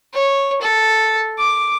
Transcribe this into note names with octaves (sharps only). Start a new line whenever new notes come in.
C#5
A4
D6